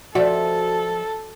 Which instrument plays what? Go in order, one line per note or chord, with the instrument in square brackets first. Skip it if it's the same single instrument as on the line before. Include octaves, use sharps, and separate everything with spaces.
[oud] F3 D5 E5 [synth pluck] F#4 [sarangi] A4